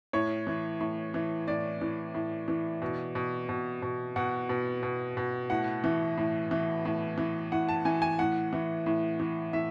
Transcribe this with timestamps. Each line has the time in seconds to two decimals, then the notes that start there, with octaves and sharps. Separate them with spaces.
0.13 A2 C#5
0.47 E3
0.80 A2
1.14 E3
1.48 A2 D5
1.81 E3
2.14 A2
2.48 E3
2.82 B2
3.15 B2
3.49 B2
3.82 B2
4.16 B2 F#5
4.49 B2
4.83 B2
5.17 B2
5.50 A2 F#5
5.84 E3
6.18 A2
6.51 E3
6.85 A2
7.18 E3
7.52 A2 F#5
7.69 A5
7.85 E3 G#5
8.02 G#5
8.19 A2 F#5
8.53 E3
8.86 A2
9.20 E3
9.53 A2 E5